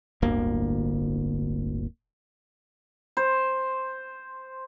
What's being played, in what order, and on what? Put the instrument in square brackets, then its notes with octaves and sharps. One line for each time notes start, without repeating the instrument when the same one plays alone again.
[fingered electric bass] D1 G1 D2 A#3
[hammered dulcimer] C5